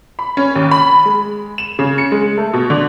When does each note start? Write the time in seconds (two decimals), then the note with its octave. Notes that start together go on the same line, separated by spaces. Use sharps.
0.19 B5
0.37 C#4
0.56 D#2
0.71 B5
1.05 G#3
1.58 E7
1.79 C#3
1.98 C#7
2.12 G#3
2.38 A3
2.54 B2
2.70 D3